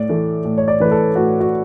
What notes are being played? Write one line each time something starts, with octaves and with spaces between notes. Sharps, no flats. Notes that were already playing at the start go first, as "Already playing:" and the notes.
Already playing: A2 D5
E3 A3
A2
C#5
D5
E3 A3 B4
A4
A2 F#4
F#4